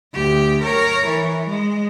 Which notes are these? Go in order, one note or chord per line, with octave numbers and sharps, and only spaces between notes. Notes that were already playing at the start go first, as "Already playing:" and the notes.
D2 G4
A#4 C#5
E3
G#3